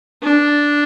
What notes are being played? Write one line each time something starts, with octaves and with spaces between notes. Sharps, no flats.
D4